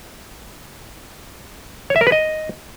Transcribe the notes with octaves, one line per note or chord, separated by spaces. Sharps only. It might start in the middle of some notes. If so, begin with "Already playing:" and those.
C#5
E5
A#4
B4
D#5